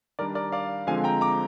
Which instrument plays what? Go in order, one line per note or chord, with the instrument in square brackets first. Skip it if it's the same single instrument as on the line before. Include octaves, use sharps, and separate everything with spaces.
[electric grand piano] D#3 G3 D4 A#4 D5
A#4 D5
D5 F5
D3 F3 G#3 C4 F5 G#5
G5 A#5
A#5 D6